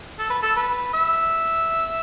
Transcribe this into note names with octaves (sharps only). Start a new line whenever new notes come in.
A4
B4
A4
B4
E5